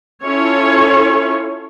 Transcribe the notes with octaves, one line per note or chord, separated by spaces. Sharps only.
C#4 E4 F4 A4 C#5